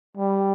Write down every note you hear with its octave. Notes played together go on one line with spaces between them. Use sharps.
G3